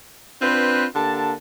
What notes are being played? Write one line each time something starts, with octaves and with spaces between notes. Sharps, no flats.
C4 D4 F4 B4
D3 A#3 G4 A5